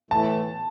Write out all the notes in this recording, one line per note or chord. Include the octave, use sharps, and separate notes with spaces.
A2 E3 A3 A5